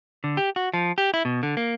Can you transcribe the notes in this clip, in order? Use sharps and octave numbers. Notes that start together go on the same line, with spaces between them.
D3
G4
F#4
F3
G4
E4
B2
D3
A#3